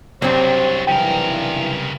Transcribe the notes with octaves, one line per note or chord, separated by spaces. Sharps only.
C2 F#2 F#3 C4 D4 C5
B1 G2 C#3 E3 A#4 G5